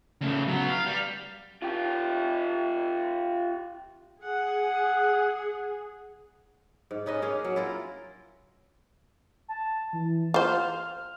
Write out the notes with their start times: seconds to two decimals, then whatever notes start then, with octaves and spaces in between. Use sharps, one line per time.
0.21 C#3 A3
0.48 F#3 B3
0.69 F5
0.86 G3
1.62 F4 G4
4.23 G#4 F#5
6.91 G#2
7.06 C#4 D#4 B4 D#5
7.22 A#3 C#4 G#4
7.44 F#3
7.56 E4 F4 A#4
9.48 A5
9.93 E3
10.34 F4 C5 F6